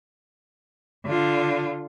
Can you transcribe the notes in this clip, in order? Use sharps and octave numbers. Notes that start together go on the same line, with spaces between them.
D3 F4